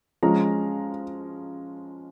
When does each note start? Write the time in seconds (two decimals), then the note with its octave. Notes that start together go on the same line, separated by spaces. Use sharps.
0.23 F3 G#3 C#4 A#5